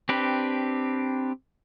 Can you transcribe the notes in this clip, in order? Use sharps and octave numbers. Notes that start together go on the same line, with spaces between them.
C4 D4 G4 B4